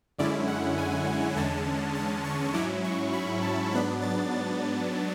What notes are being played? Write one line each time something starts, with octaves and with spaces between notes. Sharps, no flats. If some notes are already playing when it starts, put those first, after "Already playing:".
F#2 D3 G#3 C#4 E4 D5
F#5
G#5
E2 D3 G#3 C#4 A5
A5
C#6
G#2 F#3 C#4 E4 D6
C#6
B5
A5
G#2 F#3 B3 D4 B5
A6
A6